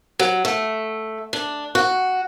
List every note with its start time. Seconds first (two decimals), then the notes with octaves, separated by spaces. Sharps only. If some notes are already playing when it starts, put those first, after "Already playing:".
0.19 F#3
0.45 A3
1.33 D4
1.75 F#4